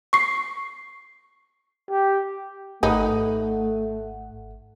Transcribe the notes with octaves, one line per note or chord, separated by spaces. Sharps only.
C#6 C7
G4
G#1 G#2 A3 D#4 B4 F#5